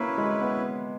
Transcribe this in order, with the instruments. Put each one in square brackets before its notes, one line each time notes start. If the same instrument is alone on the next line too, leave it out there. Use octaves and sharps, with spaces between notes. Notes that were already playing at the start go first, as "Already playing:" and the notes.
Already playing: [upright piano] A#3 [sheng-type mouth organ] C#4 E4 B4
[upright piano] G#3
B3